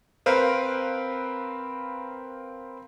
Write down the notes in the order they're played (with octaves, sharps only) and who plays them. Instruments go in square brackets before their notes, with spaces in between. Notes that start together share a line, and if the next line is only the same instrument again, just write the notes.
[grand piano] C4 A#4 B4 F5